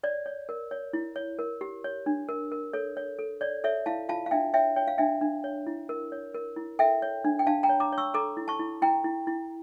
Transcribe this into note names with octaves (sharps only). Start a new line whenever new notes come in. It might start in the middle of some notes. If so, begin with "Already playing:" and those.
C#5 D5
C#5
A#4
C#5
E4
C#5
A#4
G4
C#5
D4
A#4
A#4
A4 C#5
C#5
A4
C#5 D5
A4 C#5 E5
E4 F5 A5
F4 F5 A5
F5
D4 E5 G5
C#5 E5 G5
C#5 G5
F5
D4 E5 G5
D4
C#5
E4
A#4
C#5
A#4
E4
A4 E5 G5
C#5
D4
G5
D4 F5 A5
G5 A#5
C#5
A#5 D6
C#5
C#6 E6
A4 A#5 D6
E4
A5 C#6
E4
E4 G5 A#5
E4
E4